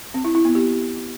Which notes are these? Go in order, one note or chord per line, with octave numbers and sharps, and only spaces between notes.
C4
E4
E4
B3
G4